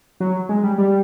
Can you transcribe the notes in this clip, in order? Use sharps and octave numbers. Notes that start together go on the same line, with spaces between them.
F#3
G#3
G3
G3